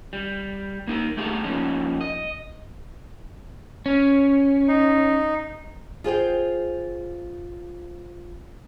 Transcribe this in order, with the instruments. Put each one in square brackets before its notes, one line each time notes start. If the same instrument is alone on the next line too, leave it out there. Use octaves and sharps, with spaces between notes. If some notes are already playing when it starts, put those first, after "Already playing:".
[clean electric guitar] G3
A#3 D#4 A#4
B1 A3 G4 G#4 G#5 A#5
F3 A#3 C#4 D#4
D#5
[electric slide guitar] C#4
[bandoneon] D#4
[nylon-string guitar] F4 G#4 C5 G5